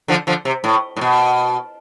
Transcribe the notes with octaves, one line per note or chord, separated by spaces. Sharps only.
D3 F3
D3 F3
C3
A2
A2
B2